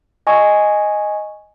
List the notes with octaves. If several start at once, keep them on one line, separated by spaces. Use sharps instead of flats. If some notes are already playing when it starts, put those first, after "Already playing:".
D#5 G#5 C#6